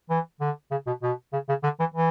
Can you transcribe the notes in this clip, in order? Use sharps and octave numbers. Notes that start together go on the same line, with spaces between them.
E3
D3
C#3
B2
B2
C#3
C#3
D3
E3
E3